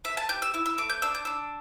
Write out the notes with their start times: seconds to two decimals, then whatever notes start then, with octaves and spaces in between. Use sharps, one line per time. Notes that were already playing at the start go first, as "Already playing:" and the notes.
0.04 A3 E5
0.17 A5
0.29 G4 G6
0.42 E6
0.54 E4 E6
0.66 E6
0.78 A3 D6
0.90 G6
1.02 D4 E6
1.15 G6
1.25 D4 E6